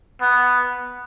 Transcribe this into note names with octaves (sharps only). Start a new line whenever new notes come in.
B3